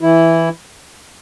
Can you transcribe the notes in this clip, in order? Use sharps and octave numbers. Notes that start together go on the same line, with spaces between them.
E3 E4